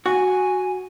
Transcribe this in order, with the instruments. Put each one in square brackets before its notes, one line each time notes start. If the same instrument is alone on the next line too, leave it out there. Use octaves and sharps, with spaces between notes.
[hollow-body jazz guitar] F#4 [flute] G#5